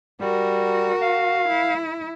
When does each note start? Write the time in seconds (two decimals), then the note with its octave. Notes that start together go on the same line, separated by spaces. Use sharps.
0.20 G3 F#4 A#4
1.01 F5
1.49 E4